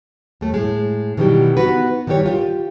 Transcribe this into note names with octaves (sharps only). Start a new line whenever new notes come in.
D#2 A3
A2 G#3
B2 D#3 E3 F#3 G3 G4
B3 D#4 F#4 B4
D#3 E3 G3 G4 C#5
F4 G4